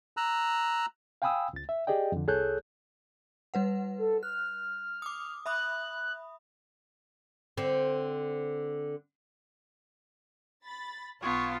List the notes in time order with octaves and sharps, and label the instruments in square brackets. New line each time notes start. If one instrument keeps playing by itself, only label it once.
[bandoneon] A#5 E6 F#6
[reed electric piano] F5 G5 G#5 B5 D#6 E6
C#2 A6
E5
G4 G#4 D5 D#5 G5
F2 D3
C2 G#4 A4 C#5 F#6 G6
[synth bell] G3 B4 F#5
[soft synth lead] A4
[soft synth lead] F6 [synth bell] F#6
[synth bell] D6 D#6
[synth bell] E5 B5 D#6 [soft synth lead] F#6
[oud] D3 C4
[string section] B5 A6
[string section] B1 F5 A5 [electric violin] B3 [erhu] F4 [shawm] C#5